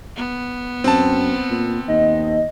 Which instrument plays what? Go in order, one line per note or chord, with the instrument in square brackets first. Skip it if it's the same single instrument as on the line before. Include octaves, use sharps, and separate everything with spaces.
[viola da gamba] B3
[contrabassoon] F#2 [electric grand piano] C4 A5
[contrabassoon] A#2
[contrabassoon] D#2 [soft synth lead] D#5